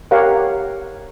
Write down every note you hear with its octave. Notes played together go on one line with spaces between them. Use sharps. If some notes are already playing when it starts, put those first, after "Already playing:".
G4 A#4 C#5 F5 F#5